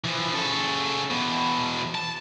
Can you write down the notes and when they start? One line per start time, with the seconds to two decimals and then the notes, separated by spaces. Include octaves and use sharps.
0.04 E3 F3
0.33 C#3 A4
1.10 E2 B2
1.95 A5